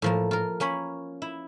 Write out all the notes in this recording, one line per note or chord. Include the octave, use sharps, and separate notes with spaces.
A2 F3 A#3
F4 A#4
A#3 C#4 C#5 B5
E4